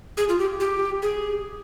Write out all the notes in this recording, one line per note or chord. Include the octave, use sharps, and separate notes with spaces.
G#4
F4
G4
G4
G#4